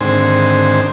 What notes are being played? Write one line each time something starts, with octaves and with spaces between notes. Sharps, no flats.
G#2 D3 D#3 C4 C5 G#5